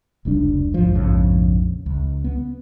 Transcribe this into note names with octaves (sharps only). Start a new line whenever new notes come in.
F1 C#2 G3 D4
A1 E2 G#2 F3
A#1 F2 G#2 C#3
C#2
B3